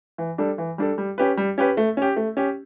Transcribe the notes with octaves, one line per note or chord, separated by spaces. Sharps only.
E3
G3 D4 A4
E3
G3 D4 A4
G3
C#4 G4 B4
G3
C#4 G4 B4
A3
C#4 G4
A3
C#4 G4